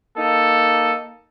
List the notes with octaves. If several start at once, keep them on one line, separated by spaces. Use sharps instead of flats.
A#3 D#4 A4